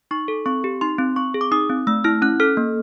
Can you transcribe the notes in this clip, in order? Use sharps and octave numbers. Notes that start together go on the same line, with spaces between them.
D#4 C#6
A4
C4 C#6
G4
D#4 C6
C4
C4 C#6
G#4
D6
D#4 D#6
C4
A3 E6
E4 F6
C#4 F#6
A4 F6
A#3